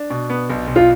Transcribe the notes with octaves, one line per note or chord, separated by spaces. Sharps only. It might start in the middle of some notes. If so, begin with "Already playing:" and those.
Already playing: D4
B2
B3
B1
B1
F4